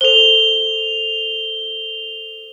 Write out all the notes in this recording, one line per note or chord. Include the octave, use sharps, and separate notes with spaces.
A4 C5 F7 G7